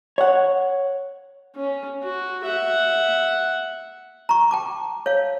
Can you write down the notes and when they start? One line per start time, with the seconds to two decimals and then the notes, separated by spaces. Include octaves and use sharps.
0.18 C#5 F#5
1.56 C#4
2.03 F#4
2.45 E5 F#5
4.29 A#5 C#6
4.51 G5 A5 D6
5.06 C#5 F5